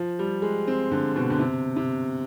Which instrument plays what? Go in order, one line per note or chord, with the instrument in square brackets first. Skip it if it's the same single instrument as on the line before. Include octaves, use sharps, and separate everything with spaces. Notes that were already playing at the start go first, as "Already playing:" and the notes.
Already playing: [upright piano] F3
G3
G#3
C4
D3
B2
D3
C3
C3